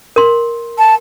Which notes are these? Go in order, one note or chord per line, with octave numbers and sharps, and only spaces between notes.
A#4 C6
A5